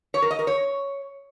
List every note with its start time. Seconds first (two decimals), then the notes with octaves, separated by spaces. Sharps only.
0.14 C#5
0.22 A#4
0.31 D#5
0.39 A#4
0.47 C#5